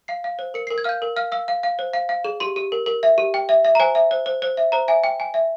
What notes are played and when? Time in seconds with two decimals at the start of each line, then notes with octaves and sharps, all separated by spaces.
0.08 F5 C7
0.24 F5
0.39 C5
0.54 A#4 C#7
0.67 C7
0.70 A#4
0.78 G#6
0.84 F5 F6 G6
1.02 A#4
1.16 F5 F6
1.32 F5 E6
1.48 F5
1.63 F5
1.79 C5
1.93 F5
2.09 F5
2.25 G#4
2.40 G4 C6
2.56 G4
2.72 A#4
2.86 A#4
3.03 E5
3.18 G4
3.34 G5
3.49 E5
3.65 E5
3.75 A#5
3.80 C5 G#5
3.95 E5
4.11 C5
4.26 C5
4.42 C5
4.57 E5
4.72 C5 A#5
4.88 E5 G#5
5.04 G5
5.20 G5 G#5
5.34 E5